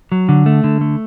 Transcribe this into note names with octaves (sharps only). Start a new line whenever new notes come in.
F#3
D3
A3
D3
A3